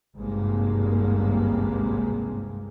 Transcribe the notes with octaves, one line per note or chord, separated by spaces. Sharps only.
G#1 C#2 G2 C3 G#3 A#3